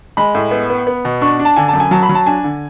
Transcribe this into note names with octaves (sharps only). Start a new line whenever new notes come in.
G#3 B5
A2
B3
B3
B3
B2
D4 C#6
D4
A5
D3 G#5
A5
F#2
G#5
F#3 A5
B5
F#3
A5
D4 G#5
D3